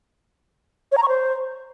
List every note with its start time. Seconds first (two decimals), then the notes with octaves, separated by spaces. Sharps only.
0.92 C#5
0.97 A#5
1.03 C#6
1.08 C5